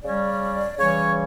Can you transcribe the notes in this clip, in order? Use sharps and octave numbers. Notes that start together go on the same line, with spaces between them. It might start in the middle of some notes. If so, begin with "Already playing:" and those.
C#3 G3 C#4 D5
C#3 E3 G3 C#5